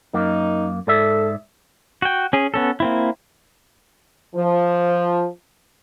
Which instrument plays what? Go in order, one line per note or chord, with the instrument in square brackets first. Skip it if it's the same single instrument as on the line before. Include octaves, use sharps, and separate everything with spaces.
[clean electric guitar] F#2 A#3 [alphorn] D#4
[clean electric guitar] G#2 D5 E5 [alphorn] A4
[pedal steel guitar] F#4 G5
C#4 G#4
B3 C#4 A4
A#3 C4 E4
[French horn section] F3